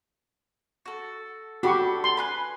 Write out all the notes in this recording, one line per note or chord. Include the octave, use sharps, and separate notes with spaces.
F#4 A4
D4 F#4 G4 A4 B5 C#6
C6
B4 G#5 F#6